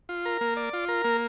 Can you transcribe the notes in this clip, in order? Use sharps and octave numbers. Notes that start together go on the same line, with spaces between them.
F4
A#4
A#3
D5
F4
A#4
A#3